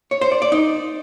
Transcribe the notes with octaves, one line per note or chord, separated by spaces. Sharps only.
C#5
C5
D5
D5
D#4